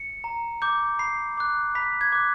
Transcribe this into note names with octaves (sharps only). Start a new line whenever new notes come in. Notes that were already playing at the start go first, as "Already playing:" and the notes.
Already playing: C#7
A#5
D6 G6
B5 C7
D6 F#6
B5 B6
G#6
D6 F#6